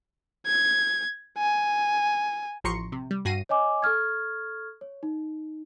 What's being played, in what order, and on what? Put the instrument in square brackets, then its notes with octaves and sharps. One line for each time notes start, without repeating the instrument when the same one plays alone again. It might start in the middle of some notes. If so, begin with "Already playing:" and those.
[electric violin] G#6
G#5
[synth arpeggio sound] A1 F3 A#5 C6 C#6 C#7
C3
G3
G2 F#4 A#6 C7 D#7
[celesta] C#5 D#5 G#5 D6
A4 C#6 F6 G#6
C#5
D#4